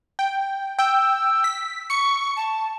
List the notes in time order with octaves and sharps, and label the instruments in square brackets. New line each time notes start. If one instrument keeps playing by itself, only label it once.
[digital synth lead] G5
[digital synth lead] G5 [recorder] E6
[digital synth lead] B6
[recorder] C#6 [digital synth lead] C#7
[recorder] A5